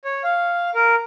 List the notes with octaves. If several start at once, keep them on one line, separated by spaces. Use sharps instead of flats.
C#5
F5
A#4